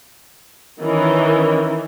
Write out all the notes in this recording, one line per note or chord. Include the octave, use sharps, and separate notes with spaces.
D#3 E3 C#4